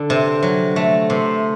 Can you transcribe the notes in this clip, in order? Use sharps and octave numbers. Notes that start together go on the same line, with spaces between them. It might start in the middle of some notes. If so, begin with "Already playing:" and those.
Already playing: D3 D4
C3
F#3
A3
C3